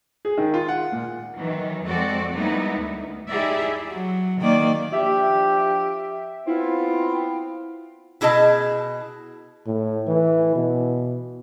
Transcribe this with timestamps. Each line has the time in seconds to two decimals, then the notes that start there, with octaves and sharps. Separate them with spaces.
0.25 G#4
0.38 D#3
0.54 F4
0.68 F#5
0.92 A#2
1.34 D#3 E3 F#3
1.85 F2 G#3 C4 F#4 A4 D5
2.34 G3 G#3 A#3 B3 D#4 E4
2.77 D2
3.28 D#4 E4 G4 G#4 D5 E5
3.91 F#3
4.41 D#3 A#3 D5
4.92 F3 D4 G4 E5
6.47 B3 C4 E4 F4
8.21 B2 E4 G#4 D#5 A5
9.67 A2
10.07 E3
10.56 B2